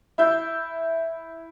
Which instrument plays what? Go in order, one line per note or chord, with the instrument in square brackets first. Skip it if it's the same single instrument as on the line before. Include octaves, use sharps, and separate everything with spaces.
[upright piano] E4 E6 G6